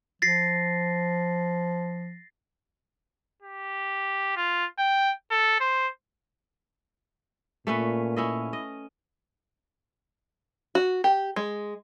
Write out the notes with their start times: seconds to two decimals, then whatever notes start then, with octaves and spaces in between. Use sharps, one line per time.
0.22 F3 A6 A#6 C7
3.42 G4
4.36 F4
4.78 G5
5.31 A4
5.60 C5
7.67 A#2 A3 C#4 B4
8.16 C#4 E4 D#5
8.53 D#5
10.75 F#4
11.04 G4
11.36 G#3